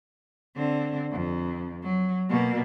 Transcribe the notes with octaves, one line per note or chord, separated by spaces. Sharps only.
D3 C4
F2
F#3
B2 A#3